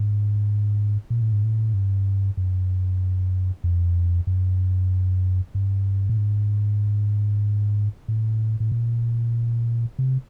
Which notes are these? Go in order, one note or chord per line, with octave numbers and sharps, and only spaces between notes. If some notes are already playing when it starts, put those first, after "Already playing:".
Already playing: G#2
A#2
A2
G#2
A2
G2
F#2
F2
F#2
G2
A2
G#2
A2
A2
A#2
C3